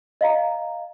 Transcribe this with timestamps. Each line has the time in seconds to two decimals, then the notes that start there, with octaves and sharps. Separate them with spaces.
0.21 D#5 F5 A#5